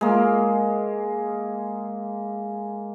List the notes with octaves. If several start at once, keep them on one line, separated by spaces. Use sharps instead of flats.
G#3 A#3